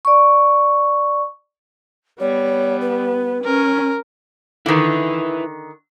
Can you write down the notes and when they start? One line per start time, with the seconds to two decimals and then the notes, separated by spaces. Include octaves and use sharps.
0.05 D5 C#6
2.20 G3 B3 C#5
2.81 B4
3.44 C#4 A#4
4.66 D3 D#3 E4 B4